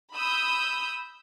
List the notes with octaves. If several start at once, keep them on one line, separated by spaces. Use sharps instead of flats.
B5 D#6 E6 G6